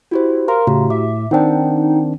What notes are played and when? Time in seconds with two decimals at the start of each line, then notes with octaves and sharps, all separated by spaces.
0.11 E4 F#4 G4 C5
0.48 A#4 F5 A#5 C6
0.67 A2 C#3 E4 F#4 G4
0.90 E5 D6
1.31 D#3 C4 D4 D#4 F#5 G5